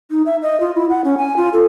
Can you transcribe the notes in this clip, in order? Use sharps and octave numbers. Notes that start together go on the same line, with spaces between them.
D#4
E5
D#5
F4
E4
F#5
C#4
G#5
F4
A4